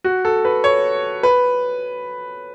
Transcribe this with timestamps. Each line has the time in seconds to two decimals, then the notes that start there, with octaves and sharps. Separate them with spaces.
0.04 F#4
0.25 A4
0.45 B4
0.64 C#5
1.23 B4